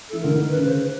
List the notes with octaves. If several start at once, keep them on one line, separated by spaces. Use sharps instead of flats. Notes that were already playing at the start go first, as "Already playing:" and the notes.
E3 A4
D3 A#4
D#3
B4
C#3
C5
B4